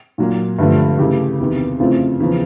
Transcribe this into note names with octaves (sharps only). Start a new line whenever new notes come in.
A#2 F#3 A#3
G2 D3 F3 A3
C#3 E3 A3 G4
E2 C3 D#3
F2 C#3 E3 A3 C4 F4
E2 C#3 F3